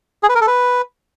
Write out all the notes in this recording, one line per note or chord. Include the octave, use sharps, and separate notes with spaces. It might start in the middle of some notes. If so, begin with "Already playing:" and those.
G#4
B4
A#4
A4
B4